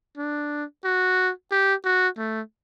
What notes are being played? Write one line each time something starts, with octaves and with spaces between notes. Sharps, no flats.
D4
F#4
G4
F#4
A3